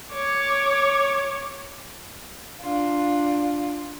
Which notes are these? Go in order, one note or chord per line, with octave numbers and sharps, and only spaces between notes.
C#5 D6
D4 F4